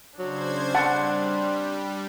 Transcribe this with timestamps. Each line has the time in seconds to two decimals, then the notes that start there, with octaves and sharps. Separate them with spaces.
0.19 C#3 F#3 D4 C5 G#6
0.75 G3 C4 F#5 A5